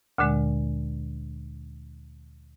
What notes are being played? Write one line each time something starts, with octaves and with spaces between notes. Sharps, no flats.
D2 A#2 D3 G#3